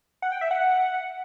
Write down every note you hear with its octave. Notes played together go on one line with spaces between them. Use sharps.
F#5
G5
E5
F#5